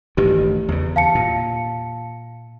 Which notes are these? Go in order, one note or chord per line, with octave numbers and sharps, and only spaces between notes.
A1 G2 D#3 G4
E2 C#3
F5 A5 C#7
A#2